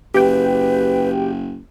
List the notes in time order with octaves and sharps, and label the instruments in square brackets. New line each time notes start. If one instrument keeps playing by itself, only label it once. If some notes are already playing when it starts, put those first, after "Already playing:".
[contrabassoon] F#1 [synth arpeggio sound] G4 G5 [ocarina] B4